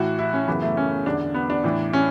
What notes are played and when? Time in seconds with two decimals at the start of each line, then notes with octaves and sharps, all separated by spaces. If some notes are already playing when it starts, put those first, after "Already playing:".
Already playing: A2 E3 F#4
0.19 E4
0.34 C#4
0.47 F#2 C#3 E3 B3
0.62 A3
0.77 C#4
1.06 E2 D3 D4
1.34 B3
1.50 D4
1.64 A2 E3
1.93 C#4